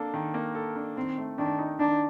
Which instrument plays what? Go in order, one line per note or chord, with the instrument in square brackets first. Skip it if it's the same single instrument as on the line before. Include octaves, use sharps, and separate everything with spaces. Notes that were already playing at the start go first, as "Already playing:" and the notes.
Already playing: [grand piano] A#3 D4 A4
D#3
A#3
A4
D4
[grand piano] D#3 [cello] C4
[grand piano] A3
[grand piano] D#3 [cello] D4
[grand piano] D#4
[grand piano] D#3 [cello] D4